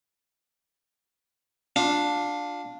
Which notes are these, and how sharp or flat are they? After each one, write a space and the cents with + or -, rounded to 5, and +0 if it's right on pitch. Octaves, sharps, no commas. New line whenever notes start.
D4 +0 F4 +20